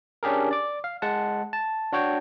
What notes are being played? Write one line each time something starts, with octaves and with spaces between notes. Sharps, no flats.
C#4 D4 G4 G#4 A#4
D5 D6
F5
G#3 F#5 A5
A5
D4 F#4 C#5 G5